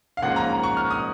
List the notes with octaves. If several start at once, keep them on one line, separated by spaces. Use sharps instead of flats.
F5
G#2 F3 A#3 C#4 F#5
A#5
A#5
C#6
F6
D#6